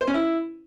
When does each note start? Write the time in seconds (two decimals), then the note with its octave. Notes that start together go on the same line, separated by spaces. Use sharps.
0.01 C5
0.07 C#4
0.14 E4